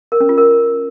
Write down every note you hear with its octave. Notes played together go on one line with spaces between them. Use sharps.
A#4
C#4
F4
A#4